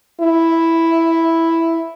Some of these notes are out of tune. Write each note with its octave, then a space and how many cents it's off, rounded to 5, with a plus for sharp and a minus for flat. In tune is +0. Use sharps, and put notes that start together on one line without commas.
E4 +0